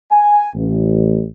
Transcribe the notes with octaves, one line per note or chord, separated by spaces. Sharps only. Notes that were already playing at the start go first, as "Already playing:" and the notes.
G#5
A1